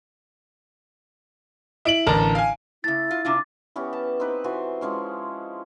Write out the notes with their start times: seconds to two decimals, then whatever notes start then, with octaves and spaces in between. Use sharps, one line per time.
1.85 E4 D7 F#7
2.07 A1 D3 A#4 A5 A#5
2.35 F5 G#5
2.84 C#3 A3 E4 A6
3.11 F4
3.25 C3 D4 F4
3.76 E3 B3 C#4 G4
3.93 A5
4.20 C4 D#4 G4 B4
4.44 E3 F#4 C5 G#5
4.81 F3 G#3 C#4 E4